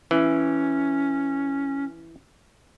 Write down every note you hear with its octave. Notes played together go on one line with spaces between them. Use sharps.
E3 C#4